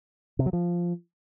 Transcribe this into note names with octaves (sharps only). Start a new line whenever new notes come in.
C3
F#3
F3